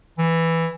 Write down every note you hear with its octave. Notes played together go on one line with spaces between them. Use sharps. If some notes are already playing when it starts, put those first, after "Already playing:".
E3